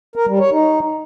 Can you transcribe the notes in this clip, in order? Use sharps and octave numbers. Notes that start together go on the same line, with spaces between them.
A#4
G3
C#5
D#4